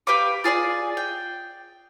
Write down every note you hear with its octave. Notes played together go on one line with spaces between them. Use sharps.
G4 B4 F5 D6
F4 G#4 C#5 D5
G5